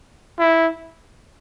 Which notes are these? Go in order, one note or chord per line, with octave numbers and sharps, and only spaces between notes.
E4